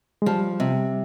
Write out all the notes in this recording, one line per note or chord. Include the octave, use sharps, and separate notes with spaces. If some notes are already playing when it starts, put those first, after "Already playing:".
G#3
F3 G3
C3